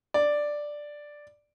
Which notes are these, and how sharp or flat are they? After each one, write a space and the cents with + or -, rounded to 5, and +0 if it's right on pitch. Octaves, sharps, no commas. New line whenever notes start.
D5 +5